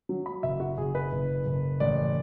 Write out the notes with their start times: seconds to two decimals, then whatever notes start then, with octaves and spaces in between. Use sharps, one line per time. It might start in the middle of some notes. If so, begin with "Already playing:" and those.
0.09 F#3
0.26 B5
0.43 F#1 E5
0.60 F#4
0.78 F#1 G#4
0.95 B4
1.12 F#1
1.46 F#1
1.80 A1 D5